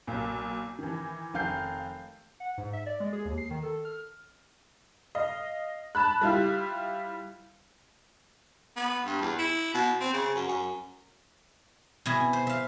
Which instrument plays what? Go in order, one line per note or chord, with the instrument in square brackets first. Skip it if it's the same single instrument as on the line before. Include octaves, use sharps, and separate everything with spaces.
[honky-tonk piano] B1 A#2
D#3 E3
F1 D#3 F5 G6 C7
[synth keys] F#5
G#2
E5
D5
G#3
G#4
D#2
C7
D#3
A4
F6
[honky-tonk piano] D#5 F5
A5 B5 F#6
G3 E4 F4 G4
[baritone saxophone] B3
G2
E2
E4
B2
C4
C#3
F#2
F#2
[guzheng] B2 E4 G#4
C5
E5 F5